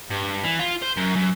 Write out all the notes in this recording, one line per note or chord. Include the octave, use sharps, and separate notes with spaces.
G2
E3
F4
C5
F#2
F#2